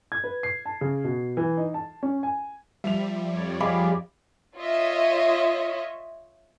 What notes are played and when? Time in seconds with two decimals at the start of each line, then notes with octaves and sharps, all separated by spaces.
0.12 G#6
0.24 B4
0.43 C7
0.66 A5
0.81 C#3
1.04 B2
1.37 E3
1.57 D#4
1.74 A5
2.03 C#4
2.23 G#5
2.84 F3 G3 E5 F7
3.30 F2 C#5 D5
3.60 F4 G4 G#4 D#5 B5 D6
4.57 F4 C#5 D#5 E5